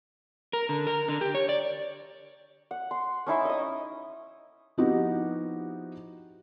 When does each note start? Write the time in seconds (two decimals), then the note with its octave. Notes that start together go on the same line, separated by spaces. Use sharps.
0.53 A#4
0.69 D3
0.87 A#4
1.08 D3
1.21 G4
1.35 C#5
1.49 D5
2.71 F#5
2.91 C6
3.26 C#4 D#4 E4 E5
3.45 D#5 D#6
4.78 F3 B3 D#4 E4 F#4 G4